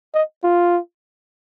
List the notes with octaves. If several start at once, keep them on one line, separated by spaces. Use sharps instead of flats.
D#5
F4